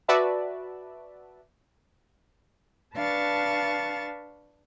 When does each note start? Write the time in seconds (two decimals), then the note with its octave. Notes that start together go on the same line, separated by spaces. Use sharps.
0.08 F#4 B4 D5 E5 A5
2.94 D4 B4 F5 A5 C#6 A6